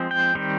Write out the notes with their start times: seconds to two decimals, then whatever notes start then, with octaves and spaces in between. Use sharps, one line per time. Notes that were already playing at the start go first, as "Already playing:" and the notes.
Already playing: F3 G#3 C4
0.11 G5
0.35 D#3 G3 C4